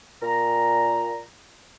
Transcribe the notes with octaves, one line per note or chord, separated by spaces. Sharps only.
A#2 A#5